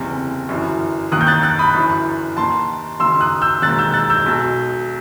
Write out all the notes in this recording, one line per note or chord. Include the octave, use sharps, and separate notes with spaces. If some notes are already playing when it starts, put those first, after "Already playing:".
Already playing: F#1 E2 C3
G1 F#2 E3
D#2 D#3 D#6 F#6
G6
F#6 A6
F#6 A6
B5 D#6
G1 F#2 E3
D#2 D#3 A5 C6
F#1 F#2 D#3 C6 E6
D#6 F#6
E6 G6
E1 D#2 D#3 F#6 A6
E6 G6
F#6 A6
E6 G6
B1 B2